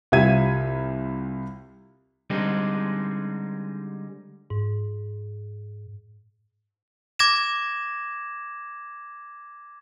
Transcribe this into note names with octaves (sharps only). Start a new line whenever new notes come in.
C2 F4 G4 E5 G#6 D#7
D3 G3 G#3 C4 D#4
G#2
D6 G#6 A#6 E7